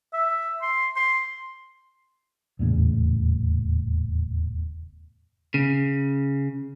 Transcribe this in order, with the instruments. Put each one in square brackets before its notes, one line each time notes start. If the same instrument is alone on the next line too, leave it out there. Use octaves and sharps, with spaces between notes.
[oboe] E5
C6
C6
[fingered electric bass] D#1 E2 A2 C#3
[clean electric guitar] C#3